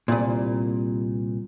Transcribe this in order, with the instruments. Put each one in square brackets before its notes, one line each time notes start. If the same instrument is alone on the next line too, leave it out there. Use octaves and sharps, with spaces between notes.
[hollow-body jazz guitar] C2 A#2